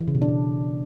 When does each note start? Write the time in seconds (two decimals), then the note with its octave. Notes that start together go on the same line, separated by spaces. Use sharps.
0.01 E3
0.08 C#3
0.15 B2
0.22 D4
0.29 B2